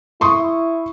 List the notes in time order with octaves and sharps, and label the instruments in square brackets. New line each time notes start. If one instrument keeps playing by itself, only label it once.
[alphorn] E4 [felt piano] C6 C#6 D#6